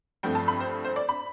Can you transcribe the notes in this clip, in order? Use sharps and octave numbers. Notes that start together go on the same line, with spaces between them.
G2 F3 A3 C4 G5
A5
B5
C5
C5
D5
B5